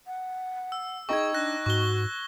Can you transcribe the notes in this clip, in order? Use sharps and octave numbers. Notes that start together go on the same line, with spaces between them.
F#5
E6
D#4 G#4 D#5 G5 C#6 G#6
D4 F#6 G#6 A#6
G#2 F#4 C#6 G7